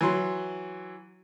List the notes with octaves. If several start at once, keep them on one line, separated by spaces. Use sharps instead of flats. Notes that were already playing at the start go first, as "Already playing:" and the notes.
E3 F#3 C6